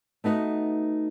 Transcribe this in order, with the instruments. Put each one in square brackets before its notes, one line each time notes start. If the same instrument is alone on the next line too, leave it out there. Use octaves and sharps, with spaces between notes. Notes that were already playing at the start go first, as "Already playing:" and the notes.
[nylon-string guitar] A3 B3 D#4 F#4